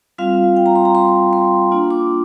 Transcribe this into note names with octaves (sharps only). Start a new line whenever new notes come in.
G3 C4 F4 F5
G5
A#5
C6
A#5
C6
C6
A#3 D4 F4
D6